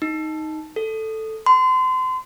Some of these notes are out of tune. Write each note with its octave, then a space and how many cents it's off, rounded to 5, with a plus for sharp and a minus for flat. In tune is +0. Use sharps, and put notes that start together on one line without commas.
D#4 +5
A4 +0
C6 -30